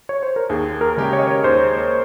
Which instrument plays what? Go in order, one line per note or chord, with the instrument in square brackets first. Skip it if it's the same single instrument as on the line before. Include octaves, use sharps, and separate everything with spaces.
[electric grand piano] C#5
C5
A#4
[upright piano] D#2 [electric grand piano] G#4
[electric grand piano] A#4
[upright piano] C#3 G#3 C#4 G4
[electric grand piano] C#5
D#5
C#5
[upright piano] D#2 [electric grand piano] C5